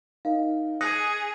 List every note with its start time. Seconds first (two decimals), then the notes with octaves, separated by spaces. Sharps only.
0.25 D#4 A#4 D#5 F5
0.81 G#4 D#6 F#6 A#6 C#7